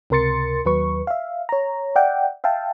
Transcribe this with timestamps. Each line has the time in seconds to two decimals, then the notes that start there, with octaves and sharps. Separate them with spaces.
0.10 C#2 C3 A#4 C6 A6 C#7
0.65 D#2 F#3 B4 C#6
1.07 E5 F5
1.49 C#5 A#5
1.96 D5 E5 F#5 G5
2.44 E5 F5 G5 A5